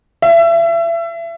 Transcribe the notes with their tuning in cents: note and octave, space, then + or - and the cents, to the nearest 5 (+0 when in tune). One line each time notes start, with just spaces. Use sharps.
E5 +30